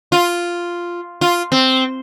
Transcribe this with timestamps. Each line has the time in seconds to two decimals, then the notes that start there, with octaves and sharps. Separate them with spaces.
0.12 F4
1.21 F4
1.52 C4